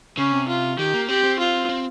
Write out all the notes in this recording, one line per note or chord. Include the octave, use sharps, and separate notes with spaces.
C#3 C#4
C3
F4
D#3 G4
A#3
C4 G4
C4
F4
C4